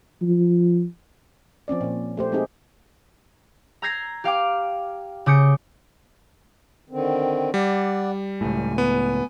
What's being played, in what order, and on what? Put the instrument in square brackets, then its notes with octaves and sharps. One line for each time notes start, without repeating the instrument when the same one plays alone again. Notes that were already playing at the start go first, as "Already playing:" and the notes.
[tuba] F3
[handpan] F3 C4 C#4 D5
A#2 F3
A3 G4 C5
G#3 C4 D#4 G4 G#4
[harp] A#5 E6 G6 G#6 A#6 C7
G4 F5 G5 D6
C#3 D6 D#6 G6 C#7
[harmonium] D3 D#3 C4
[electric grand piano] G3 [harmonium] D5 F#5
[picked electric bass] C#2 A2 [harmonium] G#5
[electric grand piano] B3